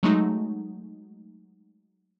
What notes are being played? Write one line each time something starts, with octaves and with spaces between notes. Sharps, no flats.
F#3 G#3 A3 D#4